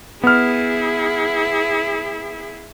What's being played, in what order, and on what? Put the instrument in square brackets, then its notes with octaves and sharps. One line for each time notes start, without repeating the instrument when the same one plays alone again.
[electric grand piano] B3 F6 [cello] E4 G#4